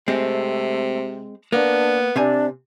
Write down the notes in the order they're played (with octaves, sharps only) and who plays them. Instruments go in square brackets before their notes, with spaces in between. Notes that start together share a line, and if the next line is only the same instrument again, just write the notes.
[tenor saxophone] C3 [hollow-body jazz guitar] G#3 C4 [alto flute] A3
[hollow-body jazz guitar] A#3 [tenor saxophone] B3 [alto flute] D4
[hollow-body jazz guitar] C3 C4 G#5 [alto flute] D4